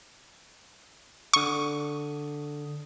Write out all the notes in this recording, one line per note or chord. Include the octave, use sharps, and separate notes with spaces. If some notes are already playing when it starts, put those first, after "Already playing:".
D3 C#6 D#6